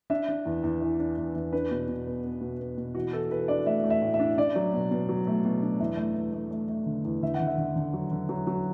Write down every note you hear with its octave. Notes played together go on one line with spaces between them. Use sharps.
D4 E5
D4
E2
E2
E3
D4
E2
E2
D4 B4
B2
B2
B3
B3
B2
B3
B2
E3 F#4
E3 A4
E3 B4
D4 D5
A3 E5
A3
E5
A2
E5
D4
D4 D5
F#3
B2
B2
F#3
A3
B2
D4
E2 E5
A3
E2
A3
A3
A3
D3
E2
D3 E5
F#5
D3
E5
D3
D3
F#3
D3
F#3
F#3